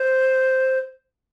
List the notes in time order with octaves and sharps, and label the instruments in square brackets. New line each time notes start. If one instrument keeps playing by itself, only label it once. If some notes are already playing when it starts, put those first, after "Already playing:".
Already playing: [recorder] C5